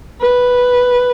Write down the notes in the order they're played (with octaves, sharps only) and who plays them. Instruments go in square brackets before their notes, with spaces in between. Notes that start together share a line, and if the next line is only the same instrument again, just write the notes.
[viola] B4